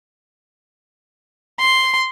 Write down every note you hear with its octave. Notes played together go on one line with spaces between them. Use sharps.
C6